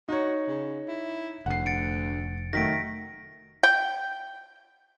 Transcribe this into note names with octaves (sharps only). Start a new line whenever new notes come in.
D#4 F#4 C#5
C#3
E4
F1 D2 F#5 C7
A6 C#7 D7
D#3 F#3 A3 A#6 B6 D7
G5